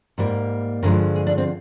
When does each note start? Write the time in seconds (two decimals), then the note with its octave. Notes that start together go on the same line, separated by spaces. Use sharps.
0.18 G#2 G3 A#3
0.83 G2 D3 F3 G#3 A#4
1.15 G#4
1.27 D4
1.38 C4